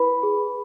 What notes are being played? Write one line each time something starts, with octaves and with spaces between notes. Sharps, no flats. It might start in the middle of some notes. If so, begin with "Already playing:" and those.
Already playing: E4 B4 B5
G#4